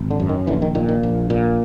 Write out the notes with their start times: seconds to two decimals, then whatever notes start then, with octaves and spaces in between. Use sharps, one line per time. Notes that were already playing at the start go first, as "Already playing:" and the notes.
Already playing: G#1
0.11 D3
0.20 F#2
0.29 D#3
0.47 A#1 D3 E3
0.62 D#3
0.75 A#2 D#3
0.89 D#3
1.03 A#1
1.30 A#2